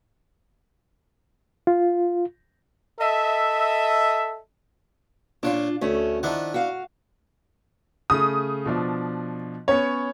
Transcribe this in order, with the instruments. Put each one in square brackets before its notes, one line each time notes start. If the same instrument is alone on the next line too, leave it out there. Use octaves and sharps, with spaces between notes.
[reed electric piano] F4
[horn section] A4 D#5 E5
[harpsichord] A#2 C#5 [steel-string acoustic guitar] D4 F4
[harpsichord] D2 [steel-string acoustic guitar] A3 C#4
[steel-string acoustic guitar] D#3 F3 [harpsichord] D4 E4 F#5
[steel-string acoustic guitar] F#4 F5
[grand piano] C#3 A3 [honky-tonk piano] D#6
[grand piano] B2 F3 D4
[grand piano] B3 C#4 [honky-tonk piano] C#5